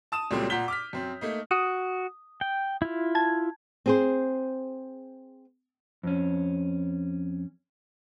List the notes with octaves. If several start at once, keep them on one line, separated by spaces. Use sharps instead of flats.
A5 D#6 E7
C#2 A#2 F#3 G3 A3 C4
A#2 F#5 A#5 G6 B6 G7
D6 F6 B6
F#2 C4
A3 A#3 D#4
F#4 D#6
G5
E4 F4
A5 G#6
C4 G#4 C5
F2 C#4